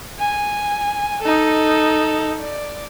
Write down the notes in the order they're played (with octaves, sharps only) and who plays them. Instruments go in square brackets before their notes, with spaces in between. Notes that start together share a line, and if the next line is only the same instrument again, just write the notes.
[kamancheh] G#5
D#4 A4
D5